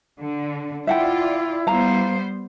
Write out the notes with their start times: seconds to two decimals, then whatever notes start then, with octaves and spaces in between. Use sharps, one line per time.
0.19 D3
0.87 E4 F4 D5 E5 F#5 G5
1.67 G3 B3 C5 F5 A#5